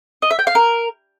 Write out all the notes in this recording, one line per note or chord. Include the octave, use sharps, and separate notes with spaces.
D#5
E5
G5
F5
A#4